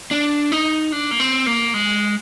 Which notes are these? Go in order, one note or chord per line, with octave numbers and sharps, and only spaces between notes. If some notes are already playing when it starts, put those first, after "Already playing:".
D4
D#4
D4
A#3
C4
A#3
G#3